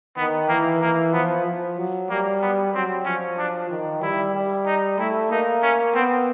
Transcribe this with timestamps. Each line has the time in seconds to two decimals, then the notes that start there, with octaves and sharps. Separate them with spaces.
0.17 D#3 B3
0.49 E3 A#3
0.81 E3 A#3
1.13 F3 B3
1.46 F3
1.78 F#3
2.10 G3 A#3
2.42 B3
2.74 F#3 C4
3.05 F3 C#4
3.38 D4
3.70 D#3
4.02 G3 E4
4.35 G3
4.66 D#4
4.99 A3 E4
5.31 A#3 D#4
5.62 C#4
5.94 B3 C4